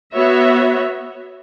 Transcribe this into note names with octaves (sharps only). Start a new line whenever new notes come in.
B3 F#4 C#5 E5